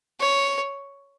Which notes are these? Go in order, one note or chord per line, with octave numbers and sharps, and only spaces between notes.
C#5